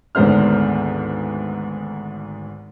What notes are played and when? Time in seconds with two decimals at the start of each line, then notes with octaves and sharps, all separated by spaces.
0.15 G#1 D2 G#2 B3 C5 F6